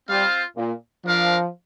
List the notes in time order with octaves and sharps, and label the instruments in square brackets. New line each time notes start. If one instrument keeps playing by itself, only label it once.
[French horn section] G3 [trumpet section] C4 F4 C5 F5
[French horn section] A#2
[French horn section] F3 [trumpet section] D4 A#4 F5